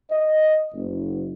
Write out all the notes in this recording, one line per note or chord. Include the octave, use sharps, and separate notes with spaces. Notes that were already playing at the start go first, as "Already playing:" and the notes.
D#5
F#1